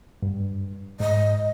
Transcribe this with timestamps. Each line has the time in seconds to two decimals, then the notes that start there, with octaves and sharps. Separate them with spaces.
0.22 G2
1.00 G#2 D#5